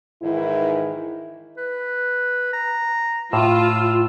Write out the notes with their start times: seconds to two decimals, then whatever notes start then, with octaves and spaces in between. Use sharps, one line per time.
0.22 G#2 D#3 E3 E4
1.57 B4
2.53 A#5
3.33 A2 F4 E6